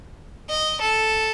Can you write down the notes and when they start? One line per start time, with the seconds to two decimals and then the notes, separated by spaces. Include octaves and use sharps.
0.50 D#5
0.81 A4